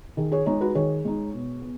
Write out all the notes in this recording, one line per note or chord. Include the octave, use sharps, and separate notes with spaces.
D#3 G#4
G#4 C#5
G#3 D#4 G#4 C#5
F#4 B4
D#3 G#4 C#5
G#3 D#4
B2
B3